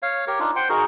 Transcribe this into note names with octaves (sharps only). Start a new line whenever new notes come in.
C#5 F5
G4 A#4 C#5
D4 D#4 F4
C5 F#5 G5 C6
D#4 F#4 G#4 A#4